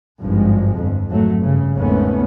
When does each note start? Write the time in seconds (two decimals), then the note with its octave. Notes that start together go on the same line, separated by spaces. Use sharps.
0.22 G#1 G2 F3 G#3
0.76 G1 F2
1.09 G#1 F#3 A3
1.38 G2 C#3
1.76 G#1 E2 G#2 A3 B3 C#4